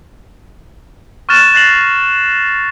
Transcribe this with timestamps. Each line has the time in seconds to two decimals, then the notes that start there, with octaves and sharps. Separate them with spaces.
1.29 C#6 F6 F#6 A6 E7
1.54 F#6 A6 A#6 C7 F7 F#7